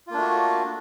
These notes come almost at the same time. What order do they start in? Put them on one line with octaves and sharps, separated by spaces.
F4 A#3 D4 A3 F#4